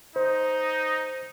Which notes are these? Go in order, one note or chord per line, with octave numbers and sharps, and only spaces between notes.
D#4 C5